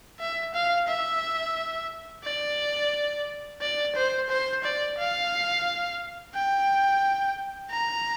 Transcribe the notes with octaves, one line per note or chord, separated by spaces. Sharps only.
E5
F5
E5
D5
D5
C5
C5
D5
F5
G5
A#5